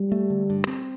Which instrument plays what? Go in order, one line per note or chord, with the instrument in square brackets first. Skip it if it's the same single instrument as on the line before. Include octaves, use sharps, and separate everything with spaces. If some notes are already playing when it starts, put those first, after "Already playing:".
Already playing: [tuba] G3
[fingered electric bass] A3
D3
G2
C4